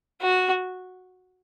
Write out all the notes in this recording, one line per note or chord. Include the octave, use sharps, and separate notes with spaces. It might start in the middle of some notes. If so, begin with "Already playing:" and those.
F#4